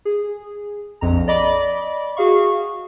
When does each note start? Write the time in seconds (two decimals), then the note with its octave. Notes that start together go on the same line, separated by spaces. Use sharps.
0.05 G#4
1.01 A#1 F2 A#5
1.28 D5 D#5 B5 D6
2.17 F#4 G#4 F5 C#6